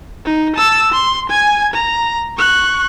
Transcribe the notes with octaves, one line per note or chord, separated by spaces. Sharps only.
D#4
A5 E6
C6
G#5 G#6
A#5
C#6 F#6